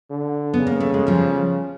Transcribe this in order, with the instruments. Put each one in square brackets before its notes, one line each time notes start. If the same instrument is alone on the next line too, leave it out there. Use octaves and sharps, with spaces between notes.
[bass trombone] D3
[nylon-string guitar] B3
[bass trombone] C#3
[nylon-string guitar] A#3
A3
G#3
F3 G3